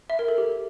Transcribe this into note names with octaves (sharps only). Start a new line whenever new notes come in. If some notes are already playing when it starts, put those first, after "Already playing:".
E5
A#4
A4
G4